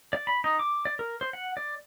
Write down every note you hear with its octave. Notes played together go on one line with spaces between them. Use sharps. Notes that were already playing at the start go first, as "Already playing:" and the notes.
D5
B5
D#4
D6
D5
A#4
C5
F#5
D5